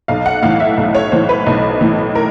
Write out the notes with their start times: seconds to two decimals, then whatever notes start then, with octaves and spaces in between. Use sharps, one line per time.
0.08 B1 F5
0.26 F#5
0.42 A2 E3 F5
0.60 E5
0.77 B1
0.95 C#5
1.12 A2 E3 C5
1.29 B4
1.46 B1
1.81 A2 E3
2.15 A#4